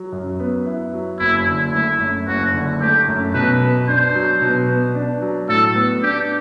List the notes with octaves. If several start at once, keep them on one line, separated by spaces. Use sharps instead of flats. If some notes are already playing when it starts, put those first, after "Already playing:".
Already playing: F#3
F#2
B3
E4
F#3
F#1 E4
D3
A3 E4
F#2
F#1 F#4
D3
A3 G4
F#2
B2 B4
B3
D4 C5
F#3
B2
B3
D4
F#3
A2 A4
B3
D4 G4